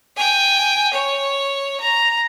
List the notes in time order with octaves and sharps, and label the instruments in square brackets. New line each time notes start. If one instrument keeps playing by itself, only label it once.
[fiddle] G5 G#5
C#5
A#5